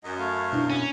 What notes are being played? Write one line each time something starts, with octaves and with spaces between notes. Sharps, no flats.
F#2 D#5
A3 F5
B2 D4 E4
C#4